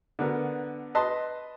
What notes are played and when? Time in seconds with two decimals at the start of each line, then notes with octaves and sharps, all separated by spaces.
0.19 D3 B3 A#4
0.95 B4 D#5 A5 C6